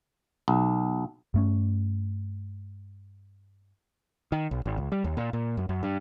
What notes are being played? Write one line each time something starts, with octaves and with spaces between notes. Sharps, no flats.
B1
G2 A3 C#4
D#3
B1
G#1
C#2
G3
D#2
A#2
A#2
F#2
F#2
G2